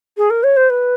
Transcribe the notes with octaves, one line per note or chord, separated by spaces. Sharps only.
G#4
A#4
C#5
C5
B4